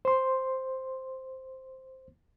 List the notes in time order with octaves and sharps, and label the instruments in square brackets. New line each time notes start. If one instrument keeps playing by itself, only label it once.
[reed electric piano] C5 C6